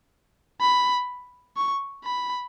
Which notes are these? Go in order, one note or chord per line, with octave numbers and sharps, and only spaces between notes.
B5
C#6
B5